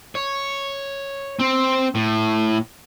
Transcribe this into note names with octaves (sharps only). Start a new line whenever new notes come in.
C#5
C4
A2